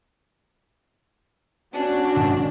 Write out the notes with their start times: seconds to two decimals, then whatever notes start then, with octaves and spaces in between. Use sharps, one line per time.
1.74 C#4 D4 F#4
2.16 G#1 D#3 F3